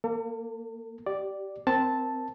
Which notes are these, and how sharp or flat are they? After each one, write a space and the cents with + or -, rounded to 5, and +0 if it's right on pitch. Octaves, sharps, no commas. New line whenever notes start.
A#3 +0 A4 +45
G4 -20 D5 +0
C4 -10 A#4 +0 A5 +0